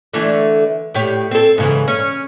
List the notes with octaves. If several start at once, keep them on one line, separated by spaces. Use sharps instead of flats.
D3 E3 A3
A2 G4 C#5
C4 A4
G#2 C#3 E3
C#4